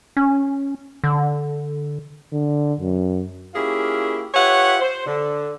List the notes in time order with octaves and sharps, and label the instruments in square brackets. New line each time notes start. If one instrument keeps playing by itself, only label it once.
[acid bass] C#4
D3
[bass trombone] D3
F#2
[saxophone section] A#3 C#4 E4 F4 G4 G#4
F4 G4 B4 C#5 E5 F#5
C5
D3